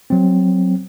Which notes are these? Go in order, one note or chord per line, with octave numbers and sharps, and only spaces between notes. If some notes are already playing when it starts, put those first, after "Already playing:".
F#3 C4